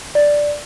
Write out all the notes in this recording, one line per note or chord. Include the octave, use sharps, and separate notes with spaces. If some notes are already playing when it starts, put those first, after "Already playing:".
D5